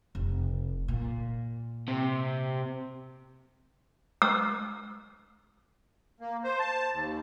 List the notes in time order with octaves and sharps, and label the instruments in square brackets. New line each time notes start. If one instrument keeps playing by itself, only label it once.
[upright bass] F1
A#2
[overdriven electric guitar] C3
[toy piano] E6
[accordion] A#3
C5
A5
D#2